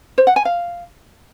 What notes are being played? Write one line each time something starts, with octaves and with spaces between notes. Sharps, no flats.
C5
F#5
G#5
F5